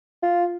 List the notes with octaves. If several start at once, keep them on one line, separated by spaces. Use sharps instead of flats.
F4